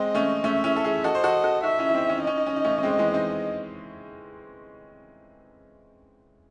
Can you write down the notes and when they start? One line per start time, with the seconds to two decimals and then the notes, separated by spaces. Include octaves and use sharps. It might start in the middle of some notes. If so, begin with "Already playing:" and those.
Already playing: G#3 C4 D#5
0.15 A3 C#4
0.44 A3 C#4 E5
0.64 C#4 E4
0.76 A4
0.84 E4 G#4
1.04 F#4 A4 D#5
1.15 C5
1.24 F#4 A4
1.44 F#4 A4
1.64 D#4 F#4 E5
1.78 C#4 E4
1.89 E4
1.94 C4 D#4
2.09 C#4
2.18 D#4
2.24 C#4 D#5
2.37 D#4
2.46 C#4
2.56 D#4
2.65 A3 C#4
2.78 C#4
2.83 G#3 C4
2.99 E3 G#3
3.13 C4 D#4